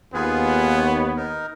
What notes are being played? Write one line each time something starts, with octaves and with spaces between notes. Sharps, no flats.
D#2 B3 F4 G#4 B4
C#5
D#4 A#4